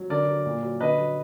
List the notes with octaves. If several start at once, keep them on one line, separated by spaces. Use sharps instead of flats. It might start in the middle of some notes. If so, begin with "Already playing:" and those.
Already playing: F#3
D3 A#4 D5
F#3
A#2
F#3
D3 B4 D#5
F#3